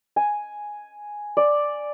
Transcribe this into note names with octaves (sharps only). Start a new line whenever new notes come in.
G#5
D5